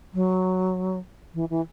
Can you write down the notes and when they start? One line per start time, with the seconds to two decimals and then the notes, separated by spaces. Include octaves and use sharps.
0.14 F#3
1.34 E3
1.50 E3